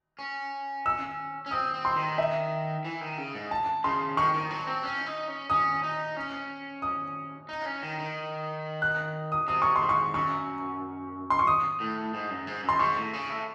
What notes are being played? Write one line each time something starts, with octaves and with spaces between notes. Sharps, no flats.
C#4
E6
C#4
C4 D#6
C4
C6
D#3
E5
E3
D#3
C#3
G#2
A5
C#3 C6
D#3 C#6
D#3
F#3
C4
C#4
D#4
C#4
C#4 D#6
D#4
C#4
D#6
D#4
C#4
D#3
D#3
F#6
D#6
C3 D#6
C#6
C6
G#2
C#6
F#2 C#6
C6
C#6
D#6
A2
G#2
F#2
G#2
F#2
C6
G#2 C#6
A2
C#3
A2